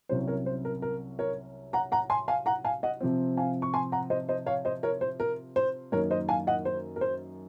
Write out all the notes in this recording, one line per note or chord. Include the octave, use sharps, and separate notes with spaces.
C2 C3 F#3 C#4 C5
A#4 C#5
C5
A#4
A#4
A#4 C#5
F#5 A#5
F#5 A#5
G#5 C6
F5 G#5
F#5 A#5
F5 G#5
D#5 F#5
C3 F3 C4
F5 G#5
C#6
G#5 C6
F#5 A#5
C5 D#5
C5 D#5
C#5 F5
C5 D#5
A#4 C#5
C5
A#4
C5
F#2 D#3 A#3 D#4 A#4 C#5
C5 D#5
F5 G#5
D#5 F#5
C5
A#4
C5